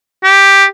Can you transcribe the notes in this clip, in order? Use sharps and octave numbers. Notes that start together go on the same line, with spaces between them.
G4